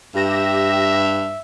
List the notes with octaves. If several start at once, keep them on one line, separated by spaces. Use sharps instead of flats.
G2 G4 E5 A#6 E7